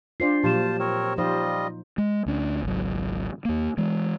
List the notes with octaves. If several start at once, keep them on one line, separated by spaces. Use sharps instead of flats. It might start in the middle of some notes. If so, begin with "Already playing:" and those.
D4 F4 C5 D5 C7
A#2 F3 F#3 F4 G4 C5 A5 E7
C4 A#4 C#5
F3 G3 D#4 F4 C5 D#5
G#3
D2 C#4 D4
G#1 C#2 F#3
D#2 A#3
E3 G#3